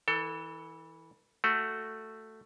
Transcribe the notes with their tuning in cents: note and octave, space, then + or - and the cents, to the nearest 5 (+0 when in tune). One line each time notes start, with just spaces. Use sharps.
E3 -20 A4 +25
A3 +5 F#4 +0